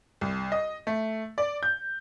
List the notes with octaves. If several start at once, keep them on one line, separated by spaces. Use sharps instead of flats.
C2
D#5
A3
D5
G6